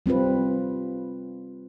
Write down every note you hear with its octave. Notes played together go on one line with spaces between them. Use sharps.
G3 C4 F4 B4